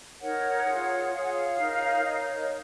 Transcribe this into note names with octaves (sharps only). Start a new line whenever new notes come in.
D#4 A#4 C#5 F#5
F4 G#4 C#5
F4 G#4 C#5 F5
F#5
F5
D#4 A#4 C#5
D#4 A#4 C#5 D#5
C#5
D#5